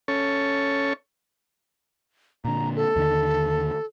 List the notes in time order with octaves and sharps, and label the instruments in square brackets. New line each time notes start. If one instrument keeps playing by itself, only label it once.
[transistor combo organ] C#4 A4 C#5
[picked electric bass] A#2 D3 [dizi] A#5
[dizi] A4
[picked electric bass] D#2 D3 D#3